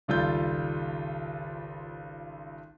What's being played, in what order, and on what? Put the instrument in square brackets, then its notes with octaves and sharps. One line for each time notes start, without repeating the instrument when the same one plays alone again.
[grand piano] G#1 C#2 G3 F4 A4 G6